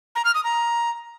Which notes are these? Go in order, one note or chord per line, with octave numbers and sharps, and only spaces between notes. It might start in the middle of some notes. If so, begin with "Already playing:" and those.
A#5
F6
D#6
A#5